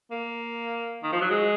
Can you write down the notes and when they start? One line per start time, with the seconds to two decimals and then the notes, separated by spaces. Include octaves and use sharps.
0.11 A#3
1.03 D#3
1.12 F3
1.21 F#3
1.30 G#3